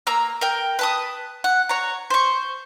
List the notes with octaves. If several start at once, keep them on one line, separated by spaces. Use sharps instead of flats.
A#3 A#5 E6
A#4 G5
B4 A5 D#6
F#5
C#5 A#5
C5 C#6